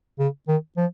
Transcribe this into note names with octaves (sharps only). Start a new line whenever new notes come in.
C#3
D#3
F3